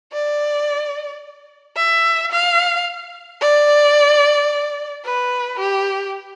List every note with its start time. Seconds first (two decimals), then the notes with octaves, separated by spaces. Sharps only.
0.13 D5
1.76 E5
2.31 F5
3.41 D5
5.04 B4
5.59 G4